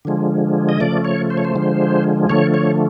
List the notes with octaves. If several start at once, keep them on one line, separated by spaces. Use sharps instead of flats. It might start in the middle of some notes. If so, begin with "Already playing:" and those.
D3 F3 G#3
D#5
C#3 F3 A3 D5
C#5
C5
C#5
C5
D3 F3 G#3
D3 F3 A3 C#5
C#5